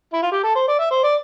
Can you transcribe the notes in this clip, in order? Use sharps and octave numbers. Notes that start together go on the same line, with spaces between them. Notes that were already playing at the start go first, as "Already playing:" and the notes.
E4
F4
G4
A4
C5
D5
E5
C5
D5